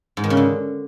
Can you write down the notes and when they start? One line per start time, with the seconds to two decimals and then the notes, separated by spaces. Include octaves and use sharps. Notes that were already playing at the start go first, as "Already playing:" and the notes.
0.17 G#2
0.24 D#3
0.30 C#3
0.37 D3